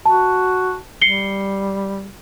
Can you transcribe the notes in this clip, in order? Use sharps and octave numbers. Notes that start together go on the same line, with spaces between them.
F#4 A5
G3 C7 C#7 G7